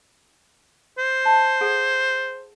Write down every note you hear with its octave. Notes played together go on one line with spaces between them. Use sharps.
C5
A5
G#4 A4 F#5